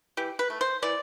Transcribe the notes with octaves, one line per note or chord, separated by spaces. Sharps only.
E3 G4
B4
A3
C5
E3 D5